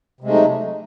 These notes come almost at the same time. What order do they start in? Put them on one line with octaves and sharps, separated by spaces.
C3 G#3 A3 D#4 F#3